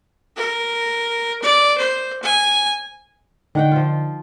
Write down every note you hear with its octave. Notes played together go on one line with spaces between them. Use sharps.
A#4
D5
C5
G#5
D3 D#3 F#5 G5
F3 F4